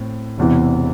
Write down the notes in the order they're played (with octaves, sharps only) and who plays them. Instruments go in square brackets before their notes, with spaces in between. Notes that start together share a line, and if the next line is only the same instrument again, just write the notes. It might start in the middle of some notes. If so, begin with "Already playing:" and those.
Already playing: [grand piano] A2 C4
E1 E2 C3 E3